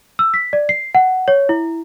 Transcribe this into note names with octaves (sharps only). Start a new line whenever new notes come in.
E6
B6
D5
C7
F#5
C#5
E4